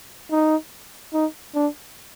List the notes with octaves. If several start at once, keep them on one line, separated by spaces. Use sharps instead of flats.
D#4
D#4
D4